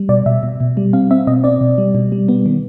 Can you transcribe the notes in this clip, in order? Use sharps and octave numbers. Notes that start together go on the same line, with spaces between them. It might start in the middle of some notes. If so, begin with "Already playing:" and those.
Already playing: G3
B2 D5
B2 E5
B2
B2
G3
C4 F5
C4 E5
B2 D#5
C4 D5
B2
G3
B2
G3
B3
D#3